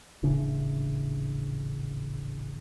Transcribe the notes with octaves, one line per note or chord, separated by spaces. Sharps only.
D#1 A1 C#3 D4